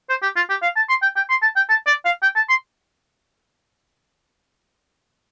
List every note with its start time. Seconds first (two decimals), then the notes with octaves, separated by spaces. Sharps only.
0.09 C5
0.23 G4
0.36 F4
0.50 G4
0.63 F5
0.76 A5
0.89 C6
1.02 G5
1.16 G5
1.30 C6
1.42 A5
1.56 G5
1.69 A5
1.87 D5
2.05 F5
2.23 G5
2.36 A5
2.49 C6